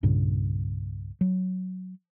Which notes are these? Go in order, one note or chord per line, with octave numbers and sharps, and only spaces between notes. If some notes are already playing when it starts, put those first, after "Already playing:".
C2 G2 A#2 C#3
F#3